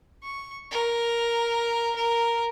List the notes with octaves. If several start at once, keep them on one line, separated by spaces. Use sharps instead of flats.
C#6
A#4
A#4